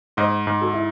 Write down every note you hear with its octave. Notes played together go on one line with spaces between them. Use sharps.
G#2 C5 D#5
G#2
F#4 A4
E4